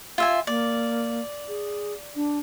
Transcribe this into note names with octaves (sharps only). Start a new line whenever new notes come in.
F4 E5 G#5
A#3 D5
G#4
D4